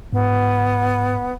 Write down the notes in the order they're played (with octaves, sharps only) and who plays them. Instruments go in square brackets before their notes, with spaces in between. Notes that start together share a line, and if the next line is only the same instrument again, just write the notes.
[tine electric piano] G#2 [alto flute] B3